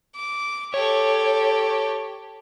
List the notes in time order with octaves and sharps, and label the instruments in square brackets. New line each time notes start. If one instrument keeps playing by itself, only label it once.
[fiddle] D6
[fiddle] G4 A4 [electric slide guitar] C#5